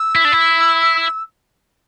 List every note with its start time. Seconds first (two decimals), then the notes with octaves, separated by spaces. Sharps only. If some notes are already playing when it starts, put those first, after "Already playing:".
Already playing: E6
0.16 E4
0.25 D4
0.32 E4